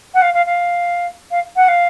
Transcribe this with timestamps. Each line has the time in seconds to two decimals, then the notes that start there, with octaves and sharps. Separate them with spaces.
0.14 F#5
0.22 F5
0.34 F5
0.46 F5
1.31 F5
1.56 F#5
1.68 F5